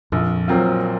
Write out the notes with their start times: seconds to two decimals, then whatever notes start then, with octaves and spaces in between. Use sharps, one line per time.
0.12 A#1 F2
0.48 A#2 F#3 C4 F4